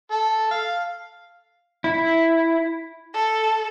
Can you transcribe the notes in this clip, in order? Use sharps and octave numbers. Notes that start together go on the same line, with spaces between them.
A4
F5
E4
A4